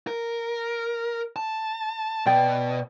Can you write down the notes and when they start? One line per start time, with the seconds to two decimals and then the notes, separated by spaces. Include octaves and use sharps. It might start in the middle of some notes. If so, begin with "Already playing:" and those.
0.07 A#4
1.36 A5
2.26 B2 D5 G5